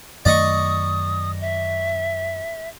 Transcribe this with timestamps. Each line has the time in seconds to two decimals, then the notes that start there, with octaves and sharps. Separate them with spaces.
0.25 F#2 D#3 A3 D5 D#5 C#6 D#6
1.41 E5